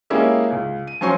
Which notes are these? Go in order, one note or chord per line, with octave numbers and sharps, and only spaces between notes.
G#3 A#3 C#4 E4 G4 G#4
C#2
D#7
F3 F#3 C#4 C5 G#5 C#6